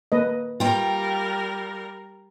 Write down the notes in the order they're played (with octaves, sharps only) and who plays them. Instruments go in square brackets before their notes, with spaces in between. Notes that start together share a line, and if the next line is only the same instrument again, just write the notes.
[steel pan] A#3 B4 D#5
[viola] G3 A#4 [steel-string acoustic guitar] F4 G5